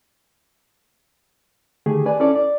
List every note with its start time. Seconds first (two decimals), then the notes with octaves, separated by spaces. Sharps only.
1.86 D3 D#3 A3 G4 G#4
2.06 D4 B4 D5 G#5
2.20 C#4 E4 A4 D5
2.35 D5